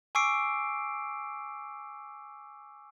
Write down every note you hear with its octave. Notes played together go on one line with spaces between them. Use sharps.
G#5 C#6 D6 E6 C7 D7